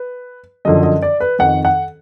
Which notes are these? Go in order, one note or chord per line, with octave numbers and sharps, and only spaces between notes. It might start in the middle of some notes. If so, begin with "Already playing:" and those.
Already playing: B4
F#2 D3 F3 D#5
D#5
D5
B4
F2 D#3 F#5
F#5